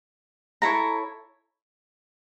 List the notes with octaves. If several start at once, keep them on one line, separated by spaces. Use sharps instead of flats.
E4 A4 C#5 A#5